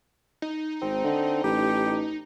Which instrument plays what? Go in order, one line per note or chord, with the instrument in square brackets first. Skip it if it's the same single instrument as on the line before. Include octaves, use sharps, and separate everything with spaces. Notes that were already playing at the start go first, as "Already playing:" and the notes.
[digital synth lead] D#4
[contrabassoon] G#1 [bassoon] C4
[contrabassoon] D3
[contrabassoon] A1 [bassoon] G4